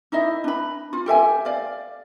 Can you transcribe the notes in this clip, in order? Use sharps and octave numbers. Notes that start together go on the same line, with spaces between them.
D#4 E4 D#5 E5
D4 B5
F4
G4 A4 E5 G#5
D5 F5